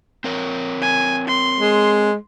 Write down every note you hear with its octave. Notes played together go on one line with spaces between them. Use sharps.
C4 A#4 C#5
G#5
C6
G#3